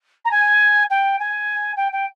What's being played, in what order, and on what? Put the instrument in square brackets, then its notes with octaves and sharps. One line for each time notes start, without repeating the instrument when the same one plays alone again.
[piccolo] A#5
G#5
G5
G#5
G5
G5